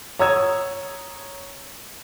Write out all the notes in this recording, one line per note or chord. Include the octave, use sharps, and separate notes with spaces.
C#5 A#5 D#6 E6 G#6